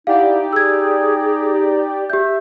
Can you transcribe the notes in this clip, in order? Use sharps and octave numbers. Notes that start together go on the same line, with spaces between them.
D#4 E4 G4 D5 F5 F#5
G#4 E6 G#6
G4 E5 G6